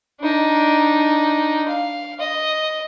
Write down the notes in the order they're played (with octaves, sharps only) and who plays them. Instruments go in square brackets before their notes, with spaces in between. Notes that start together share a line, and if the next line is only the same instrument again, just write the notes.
[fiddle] D4 D#4
F5
D#5